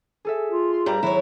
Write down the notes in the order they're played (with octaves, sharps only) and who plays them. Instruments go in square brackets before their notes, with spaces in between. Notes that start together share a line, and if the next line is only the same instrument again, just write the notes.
[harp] G#4 A4 E5
[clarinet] F4
[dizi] C6
[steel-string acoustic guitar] G2 G3 [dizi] A#5
[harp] G#1 F#3 [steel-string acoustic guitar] E4 C#5